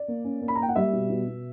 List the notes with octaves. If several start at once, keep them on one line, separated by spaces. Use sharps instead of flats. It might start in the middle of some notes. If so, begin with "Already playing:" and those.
Already playing: D5
A#3
C#4
A#3
B5
A#5
A#3 G5
F#5
G3 E5
B2
B2
B2